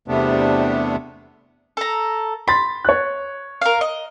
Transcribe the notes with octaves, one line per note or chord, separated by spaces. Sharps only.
E2 C3 G3 A3 B3 D4
A4 A#5
B5 C6 A6
C#5 F#6
A#4 F5
D#5